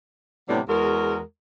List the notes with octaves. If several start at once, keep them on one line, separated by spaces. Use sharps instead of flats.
A2 C3 F#3 G3 B3 D4
E2 G#3 F#4 A#4